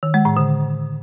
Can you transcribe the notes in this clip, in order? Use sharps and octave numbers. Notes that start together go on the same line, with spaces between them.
D#3
G#3
A2
D3